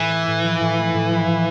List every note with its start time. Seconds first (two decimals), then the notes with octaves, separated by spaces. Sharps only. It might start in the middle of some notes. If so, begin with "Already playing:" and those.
Already playing: A2 E3
0.10 A3
0.27 A2
0.44 F3
0.60 A2
0.77 A3
0.94 A2
1.10 F3
1.27 A2